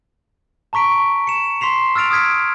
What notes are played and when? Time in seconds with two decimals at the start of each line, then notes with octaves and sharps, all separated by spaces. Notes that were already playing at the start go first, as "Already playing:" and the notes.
0.73 A5 A#5 C#6 B6 D7
1.27 C#7 E7
1.61 C6 B6 C7 F7
1.95 E6 F6 A6 D7 F7
2.11 D#6 F6 G#6 B6 D7